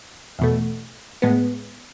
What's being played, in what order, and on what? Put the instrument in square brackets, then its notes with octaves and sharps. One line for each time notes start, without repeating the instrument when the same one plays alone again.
[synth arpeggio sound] E2 B2 A3
A2 G#3 B3